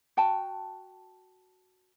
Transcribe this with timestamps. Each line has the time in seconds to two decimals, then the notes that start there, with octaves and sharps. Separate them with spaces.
0.17 F#4 G5 A5